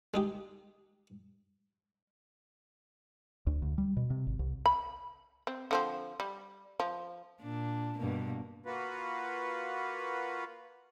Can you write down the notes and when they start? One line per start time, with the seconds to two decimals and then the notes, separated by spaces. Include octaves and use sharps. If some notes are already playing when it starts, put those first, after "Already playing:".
0.14 G#3 D#4 G4
3.47 D2
3.62 D2
3.78 G3
3.97 B2
4.10 C3
4.27 G#1
4.39 C2
4.66 B5
5.47 C4
5.71 D3 F3 C4
6.20 G3
6.80 F3
7.42 A#2 D4
7.99 G2 B2 A#3
8.66 A#3 F4 F#4 B4